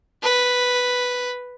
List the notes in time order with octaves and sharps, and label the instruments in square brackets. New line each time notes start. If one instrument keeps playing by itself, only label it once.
[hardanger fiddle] B4